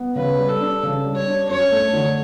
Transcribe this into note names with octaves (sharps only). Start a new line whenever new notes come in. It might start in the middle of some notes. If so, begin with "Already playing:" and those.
Already playing: B3
C#3 B4
G3
A4
D4
C#3
G3
C#5
D4
F#2 C#5
A3
D3